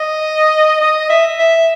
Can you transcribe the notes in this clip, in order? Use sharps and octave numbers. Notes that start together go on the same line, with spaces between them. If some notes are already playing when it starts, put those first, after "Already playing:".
Already playing: D#5
D#5
E5
E5